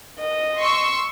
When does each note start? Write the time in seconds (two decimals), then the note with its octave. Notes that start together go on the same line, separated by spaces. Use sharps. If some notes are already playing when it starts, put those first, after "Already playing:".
0.20 D#5
0.58 C6 C#6 E6